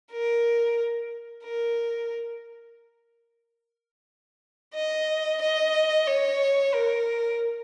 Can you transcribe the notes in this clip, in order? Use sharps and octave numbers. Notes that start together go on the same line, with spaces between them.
A#4
A#4
D#5
D#5
C#5
A#4